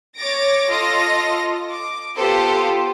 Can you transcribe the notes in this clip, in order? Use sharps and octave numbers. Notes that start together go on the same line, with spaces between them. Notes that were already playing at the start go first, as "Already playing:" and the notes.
C#5 D6 A6 A#6 D7
F4 A4 D#5 A#6
D6
B3 F4 G4 A4 C5